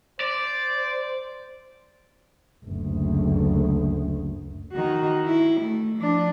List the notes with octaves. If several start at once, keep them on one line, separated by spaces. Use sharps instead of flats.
C5 D5
F#1 D2
D#3 F#4
E4
A3
F3 D4